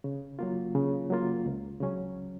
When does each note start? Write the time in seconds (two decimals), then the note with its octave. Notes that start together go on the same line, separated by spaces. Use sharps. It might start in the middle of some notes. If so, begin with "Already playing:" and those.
0.04 C#3
0.39 F#3 A#3 F4
0.75 C#3
1.10 F#3 A#3 F4
1.46 C#2
1.80 C#3 F#3 C#4